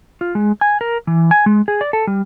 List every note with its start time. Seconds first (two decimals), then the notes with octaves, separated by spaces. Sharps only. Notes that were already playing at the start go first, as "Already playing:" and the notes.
0.21 F4
0.35 G#3
0.61 G#5
0.81 A#4
1.07 E3
1.31 G#5
1.46 G#3
1.68 G#4
1.81 D5
1.93 A4
2.07 G3